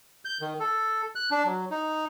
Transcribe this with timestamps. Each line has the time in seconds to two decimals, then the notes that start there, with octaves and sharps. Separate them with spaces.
0.25 G6
0.41 D#3
0.60 A4
1.15 F#6
1.31 D4
1.45 F#3
1.71 D#4